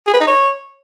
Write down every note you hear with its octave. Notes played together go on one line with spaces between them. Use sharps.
G#4
B4
D#4
C#5